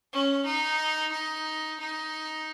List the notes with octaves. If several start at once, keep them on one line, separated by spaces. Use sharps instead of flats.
C#4
D#4
D#4
D#4